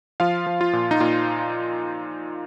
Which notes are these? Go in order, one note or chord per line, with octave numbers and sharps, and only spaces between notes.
F3 F4 F5
F3
F4
A#2
D#4
A#2 F4